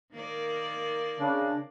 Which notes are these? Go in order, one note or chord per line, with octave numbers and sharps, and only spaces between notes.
D#3 A#3 D5
C#3 D4